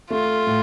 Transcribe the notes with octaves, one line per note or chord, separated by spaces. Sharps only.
A3 F4
A2